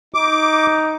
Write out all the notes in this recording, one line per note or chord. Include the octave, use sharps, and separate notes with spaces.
D#4 D6